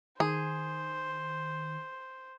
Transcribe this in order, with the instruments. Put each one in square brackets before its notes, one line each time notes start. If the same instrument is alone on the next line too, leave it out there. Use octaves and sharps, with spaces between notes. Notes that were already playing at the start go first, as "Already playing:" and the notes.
[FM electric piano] D#3 [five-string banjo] G#4 [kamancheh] C5